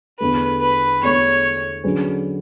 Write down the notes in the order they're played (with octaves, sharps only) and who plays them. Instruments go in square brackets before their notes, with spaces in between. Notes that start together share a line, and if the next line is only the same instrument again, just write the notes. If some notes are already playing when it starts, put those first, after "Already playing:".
[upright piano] E2 D3 A3 [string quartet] B4
[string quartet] B4
[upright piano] E2 D3 A3 [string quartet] C#5
[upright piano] D3 F#3 C#4 G#4 B4